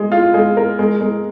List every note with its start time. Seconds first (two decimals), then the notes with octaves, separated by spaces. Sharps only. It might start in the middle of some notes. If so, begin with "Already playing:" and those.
Already playing: G#3
0.12 F4
0.34 G#3
0.57 A#4
0.79 G#3
1.01 G#3